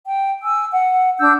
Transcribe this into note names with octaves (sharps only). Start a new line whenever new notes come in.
G5
G#5 E6
F#5
D4 E6 G6